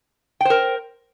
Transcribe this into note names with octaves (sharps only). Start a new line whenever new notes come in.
A#4 C5 G5